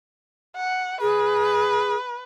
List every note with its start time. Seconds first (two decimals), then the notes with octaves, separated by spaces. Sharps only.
0.57 F#5
1.01 G#4 B4